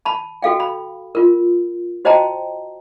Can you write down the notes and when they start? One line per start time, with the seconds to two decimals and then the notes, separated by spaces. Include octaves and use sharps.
0.05 A5 B5
0.42 F#4 A4 F5 G5
0.60 B5
1.15 F4 A#4
2.05 F#4 C5 D#5 G5 A5 A#5